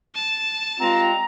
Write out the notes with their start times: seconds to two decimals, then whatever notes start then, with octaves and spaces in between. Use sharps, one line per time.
0.15 A5
0.80 G2 G#3 C4 F4 A#5